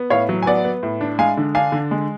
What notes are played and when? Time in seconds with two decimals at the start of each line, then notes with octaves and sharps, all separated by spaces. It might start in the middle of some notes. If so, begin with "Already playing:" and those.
Already playing: B3
0.10 A2 C#5 F5
0.29 F#3
0.43 G#5
0.46 B3 D5 F#5
0.65 B3
0.83 A2
1.01 D4
1.19 G#3 F5 G#5
1.37 D3
1.55 D4 F5 G#5
1.72 D3
1.91 G#3